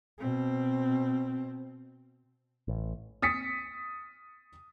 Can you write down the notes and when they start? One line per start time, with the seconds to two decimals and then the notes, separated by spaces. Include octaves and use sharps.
0.19 B2 C4
2.68 A1
3.22 D#6 A6 B6 C#7